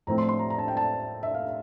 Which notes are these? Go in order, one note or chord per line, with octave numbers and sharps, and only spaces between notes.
A2 F3 A3 C4 A#5
C6
C6
A#5
A#5
A5
G5
A5
E5
F5